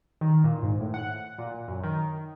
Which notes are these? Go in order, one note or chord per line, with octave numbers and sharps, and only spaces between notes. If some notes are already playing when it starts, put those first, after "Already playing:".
D#3
A#2
G#2
A2
F#5
A#2
F#2
D#3